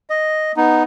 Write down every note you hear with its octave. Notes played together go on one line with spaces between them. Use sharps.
D#5
B3 D#4